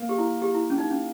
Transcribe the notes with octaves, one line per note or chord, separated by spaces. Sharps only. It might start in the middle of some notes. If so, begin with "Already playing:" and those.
Already playing: A#3
G4
E4
G4
E4
C#4
D#4
C#4